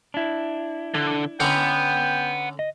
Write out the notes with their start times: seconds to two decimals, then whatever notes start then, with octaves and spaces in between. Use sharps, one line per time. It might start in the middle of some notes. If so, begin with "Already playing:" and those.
0.14 D4 E4
0.94 D3
1.40 D3 C#4 D#4 F#5 G5 B5
2.59 D#5